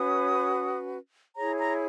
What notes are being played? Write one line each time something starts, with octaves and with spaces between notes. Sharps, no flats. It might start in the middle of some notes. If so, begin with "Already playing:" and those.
Already playing: C#4 F#4 B4 D#6
E4 G#4 C#5 A#5
A#5